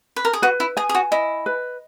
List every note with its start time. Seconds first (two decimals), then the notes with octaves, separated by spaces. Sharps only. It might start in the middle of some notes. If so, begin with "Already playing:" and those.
0.16 B4
0.25 A#4
0.33 G#4
0.42 F#4 B4
0.60 E4
0.77 G#4 G#5
0.89 G#4
0.95 F#4
1.11 E4 D#5
1.46 B4